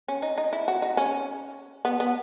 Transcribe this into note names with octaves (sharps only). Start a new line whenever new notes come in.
C#4
D#4
D#4
E4
F#4
D#4
C#4
B3
B3